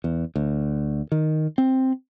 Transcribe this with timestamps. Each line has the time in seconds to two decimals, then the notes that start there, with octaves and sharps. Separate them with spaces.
0.04 E2
0.36 D2
1.12 D#3
1.58 C4